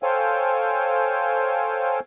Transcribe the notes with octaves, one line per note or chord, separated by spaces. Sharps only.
A4 C5 C#5 F5 G5 G#5